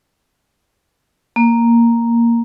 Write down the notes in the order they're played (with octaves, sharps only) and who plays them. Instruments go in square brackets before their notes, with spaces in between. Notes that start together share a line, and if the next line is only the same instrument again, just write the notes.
[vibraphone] A#3